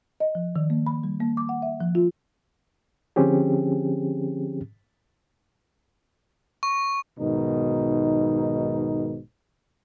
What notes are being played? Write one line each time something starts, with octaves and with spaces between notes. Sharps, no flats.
D#5
F3
D#3
A#3
B5
G3
A#3
D6
F#5
E5
F3
F4
D3 F3 C4 C#4 G4 G#4
C#6
B1 G#2 B2 D#3 D#4